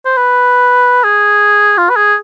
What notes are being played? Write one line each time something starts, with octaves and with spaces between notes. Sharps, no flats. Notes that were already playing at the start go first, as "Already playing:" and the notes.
C5
B4
G#4
F4
B4
G#4